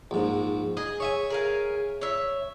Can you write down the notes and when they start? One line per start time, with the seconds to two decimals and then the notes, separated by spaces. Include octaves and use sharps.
0.11 A#1 G#2
0.77 G#4 D#5
1.00 C#5 E5 G#5
1.30 G#4 A#4 F5
2.01 C#5 E5